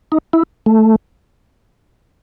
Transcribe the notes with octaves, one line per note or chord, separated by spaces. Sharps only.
D#4
E4
A3